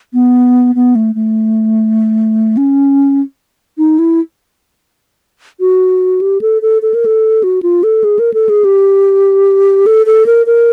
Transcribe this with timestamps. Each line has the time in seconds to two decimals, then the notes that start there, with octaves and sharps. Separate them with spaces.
0.14 B3
0.75 B3
0.95 A3
1.15 A3
2.57 C#4
3.78 D#4
3.99 E4
5.60 F#4
6.21 G4
6.41 A4
6.62 A4
6.82 A4
6.94 A#4
7.06 A4
7.43 F#4
7.63 F4
7.83 A4
8.04 G#4
8.19 A#4
8.34 A4
8.49 G#4
8.65 G4
9.86 A4
10.06 A4
10.26 A#4
10.46 A#4